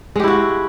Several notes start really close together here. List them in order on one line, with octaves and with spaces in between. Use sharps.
G#3 G4 E4 F#4